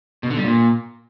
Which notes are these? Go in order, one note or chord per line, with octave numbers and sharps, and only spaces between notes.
B2
D3
G3
A#2